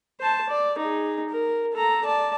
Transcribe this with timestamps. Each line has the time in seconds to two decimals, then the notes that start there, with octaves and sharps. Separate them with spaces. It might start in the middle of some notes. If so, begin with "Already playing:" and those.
0.20 C5 A5
0.49 D5
0.78 D#4 G#4
1.29 A#4
1.73 A4 A#5
2.04 D5 A5